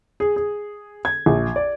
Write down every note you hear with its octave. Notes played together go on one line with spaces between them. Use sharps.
G#4
G#4
G#6
A#1
D5